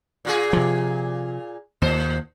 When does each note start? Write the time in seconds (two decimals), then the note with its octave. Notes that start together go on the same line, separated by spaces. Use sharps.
0.25 A#2 F4 G#4
0.53 C3 F3
1.82 D#2 A2 C5